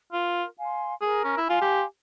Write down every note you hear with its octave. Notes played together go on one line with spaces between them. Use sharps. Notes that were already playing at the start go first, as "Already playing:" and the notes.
F4 A#4
F5 G#5 C6
G#4 A#4
C#4
E4
F4 F5 G#5 C6
G4